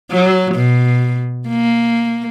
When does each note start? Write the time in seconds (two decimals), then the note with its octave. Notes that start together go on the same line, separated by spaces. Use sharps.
0.11 F#3
0.55 B2
1.48 A#3